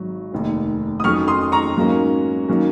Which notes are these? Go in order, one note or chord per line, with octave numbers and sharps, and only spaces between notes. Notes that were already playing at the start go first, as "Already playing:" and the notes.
Already playing: G#1 G#2 F#3
F1 D#2 D#3
D#6
F2 D#3 F#3 C#4 C#6 F6
C6 D#6
A#5 C#6
G#2 F#3 A#3 C#4
D#3 F#3 A#3 C#4